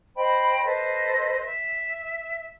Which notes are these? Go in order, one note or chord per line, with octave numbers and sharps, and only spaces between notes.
C5 D#5 G5 B5
A4 B4 C5 D#5
E5